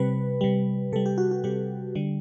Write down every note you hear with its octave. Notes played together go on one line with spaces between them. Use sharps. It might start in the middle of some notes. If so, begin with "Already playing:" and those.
Already playing: C3 G3 B4
C3 G3
C3 G3 A4
G4
F#4
F#4
C3 G3 G4
D3 G3